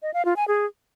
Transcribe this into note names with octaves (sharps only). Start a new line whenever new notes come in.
D#5
F5
F4
G#5
G#4